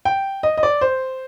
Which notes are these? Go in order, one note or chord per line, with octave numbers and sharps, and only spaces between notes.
G5
D#5
D#5
D5
C5